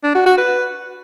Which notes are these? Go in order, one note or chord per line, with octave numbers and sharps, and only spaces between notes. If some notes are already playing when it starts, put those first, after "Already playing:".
D4
F#4
F#4
B4